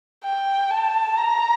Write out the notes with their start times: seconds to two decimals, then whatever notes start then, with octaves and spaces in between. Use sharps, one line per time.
0.24 G5
0.71 A5
1.18 A#5